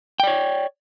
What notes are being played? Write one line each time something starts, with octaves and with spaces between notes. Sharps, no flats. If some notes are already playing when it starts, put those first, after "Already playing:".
C#5 D5 G5